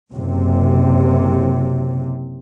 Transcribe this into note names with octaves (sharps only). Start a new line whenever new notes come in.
F#1 C3